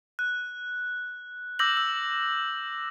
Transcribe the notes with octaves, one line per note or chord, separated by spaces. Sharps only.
F#6
D6 E6 G6 A#6 F#7
E6